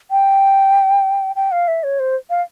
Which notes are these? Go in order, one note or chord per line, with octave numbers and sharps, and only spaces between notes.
G5
G5
F5
E5
C#5
C5
F5